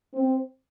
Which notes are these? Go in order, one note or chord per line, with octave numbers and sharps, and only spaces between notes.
C4